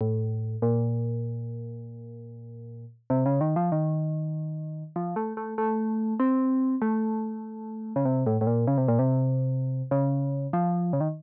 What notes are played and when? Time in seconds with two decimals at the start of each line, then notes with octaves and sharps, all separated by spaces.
0.01 A2
0.62 A#2
3.10 C3
3.26 C#3
3.41 D#3
3.56 F3
3.72 D#3
4.96 F3
5.16 A3
5.37 A3
5.58 A3
6.20 C4
6.82 A3
7.96 C#3
8.05 C3
8.26 A2
8.41 A2
8.47 A#2
8.67 C#3
8.78 C3
8.88 A#2
8.99 C3
9.91 C#3
10.53 F3
10.93 C#3
11.01 D#3